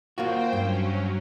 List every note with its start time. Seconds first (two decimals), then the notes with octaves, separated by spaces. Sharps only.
0.18 A#3 F4 F#4 C5 G5
0.53 G2 F#3 C#4